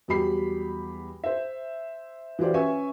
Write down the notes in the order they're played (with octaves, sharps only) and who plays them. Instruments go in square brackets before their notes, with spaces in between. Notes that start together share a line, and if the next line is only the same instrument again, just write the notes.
[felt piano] E2 F#3 G3 G4 B5 C7
C5 E5
E3 F#3 F4 G4 C5 D5
C#4 B4 E5 G#5 C#6